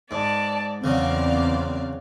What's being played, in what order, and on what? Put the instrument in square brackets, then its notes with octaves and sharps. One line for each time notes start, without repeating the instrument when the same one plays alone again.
[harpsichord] G#2 [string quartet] D5 A5
[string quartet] E2 [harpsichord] C#3 F#3 [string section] C4 D5 F5